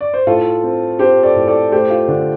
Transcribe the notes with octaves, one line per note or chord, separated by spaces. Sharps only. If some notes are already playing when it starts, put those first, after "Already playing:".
D5
C5
A2 F4 A4
C4
C4 G4 C5
A4 D5
A2
A4 D5
A3 G4 C5
F4
D3 D4